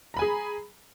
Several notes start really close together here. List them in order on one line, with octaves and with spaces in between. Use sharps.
A#5 B5 G#5 G#4